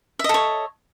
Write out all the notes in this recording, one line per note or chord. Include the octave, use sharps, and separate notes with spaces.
A4 C#5 D#5 E5